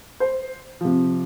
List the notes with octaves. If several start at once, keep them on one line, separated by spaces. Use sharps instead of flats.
C5
C3 F3